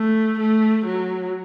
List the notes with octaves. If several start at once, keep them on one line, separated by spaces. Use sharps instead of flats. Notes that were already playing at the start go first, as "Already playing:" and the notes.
Already playing: A3
A3
F#3